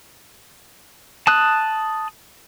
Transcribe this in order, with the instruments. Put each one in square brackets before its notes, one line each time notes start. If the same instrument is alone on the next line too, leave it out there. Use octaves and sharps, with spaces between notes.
[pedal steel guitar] A5 D#6 F#6